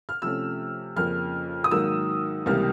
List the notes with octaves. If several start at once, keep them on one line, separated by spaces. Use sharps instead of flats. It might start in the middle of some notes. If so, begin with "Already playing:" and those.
F6
C3 F3 A3 C#4 E6
F2 C#3 F3 A#3 C#4 F6
D#6
G#2 D#3 F#3 A#3 E6
C#2 C3 E3 G3 A#3 F6